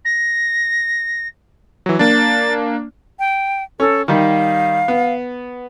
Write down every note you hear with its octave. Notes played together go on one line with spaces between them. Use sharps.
A#6
E3 F#3
A#3 D4 A6
G5
C#4 A4
D#3 G3 D#4 F5
B3